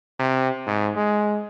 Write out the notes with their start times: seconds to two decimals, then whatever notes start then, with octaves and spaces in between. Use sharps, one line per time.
0.20 C3
0.67 G#2
0.96 G#3